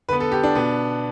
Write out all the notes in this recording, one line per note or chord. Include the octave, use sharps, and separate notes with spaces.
D3 B3 B4
A4
G4
D4
B2 B3